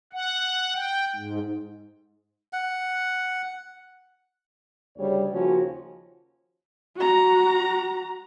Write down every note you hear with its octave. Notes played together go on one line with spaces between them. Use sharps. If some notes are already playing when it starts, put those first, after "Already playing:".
F#5
G5
G#2
F#5
D2 C#3 G3 C#5
D#2 C#3 F3 C#4 F#4
F#4 A#5